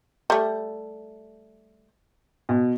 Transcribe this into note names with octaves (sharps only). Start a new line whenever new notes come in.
G3 A3
B2